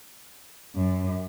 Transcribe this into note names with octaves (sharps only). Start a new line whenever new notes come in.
F#2